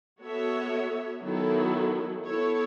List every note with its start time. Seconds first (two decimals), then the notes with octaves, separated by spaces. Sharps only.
0.22 B3 F#4 A4 C#5 E5
1.24 D#3 F#3 B3 E4 A4
2.26 B3 E4 A4 C#5